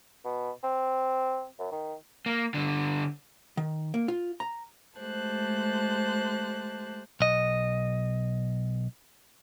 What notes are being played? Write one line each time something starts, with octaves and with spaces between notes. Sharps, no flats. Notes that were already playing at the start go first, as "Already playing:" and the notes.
B2
C4
F#2
D#3
A#3
G2 D3
D#3
A#3
F4
A#5
G#3 A3 G4 C5 A5 F#6
B1 D#5